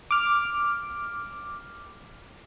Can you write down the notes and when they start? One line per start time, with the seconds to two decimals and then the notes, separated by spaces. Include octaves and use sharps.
0.11 D6 F6